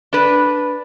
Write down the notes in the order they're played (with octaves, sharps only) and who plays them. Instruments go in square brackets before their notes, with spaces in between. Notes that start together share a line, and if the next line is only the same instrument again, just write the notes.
[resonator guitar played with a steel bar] D4 B4